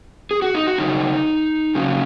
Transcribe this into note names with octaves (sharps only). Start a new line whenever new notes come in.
G#4
F#4
D#4
F#4
F#2 C#3 F#3 D#4
F#2 C#3 F#3